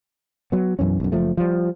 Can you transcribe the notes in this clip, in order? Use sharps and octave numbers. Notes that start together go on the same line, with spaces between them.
F#3 B3
B1 F#2 E3 C#4
B1 F#2
F#1 F3 A3
F3 G3